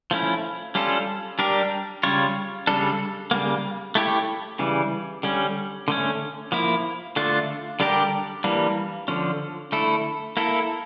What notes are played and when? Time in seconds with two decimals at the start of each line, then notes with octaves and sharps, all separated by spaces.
0.11 F3 A3 C#4 E4
0.75 G3 C#4 F4 A4
1.39 G3 D4 G4 A#4
2.03 C#3 G3 C#4 F4 C#5
2.67 C#3 G3 D4 A4
3.31 C#3 G3 A#3
3.95 A3 E4 G4 C#5
4.59 C#3 E3 G3
5.23 D3 G3 C#4
5.88 D3 A3 C#4
6.52 F3 A#3 E4
7.16 D3 A3 D4 F4
7.80 D3 G3 D4 G4 A#4
8.44 E3 G3 A#3 D4
9.08 D3 F3 C#4
9.72 D3 A3 E4 A4
10.37 A#3 E4 A4